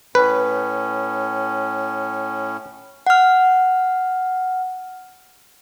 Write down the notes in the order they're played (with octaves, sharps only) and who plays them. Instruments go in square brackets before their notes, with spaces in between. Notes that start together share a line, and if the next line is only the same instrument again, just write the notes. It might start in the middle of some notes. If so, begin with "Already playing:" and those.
[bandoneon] A2 C#4 [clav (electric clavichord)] B4
[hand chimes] F#5 F6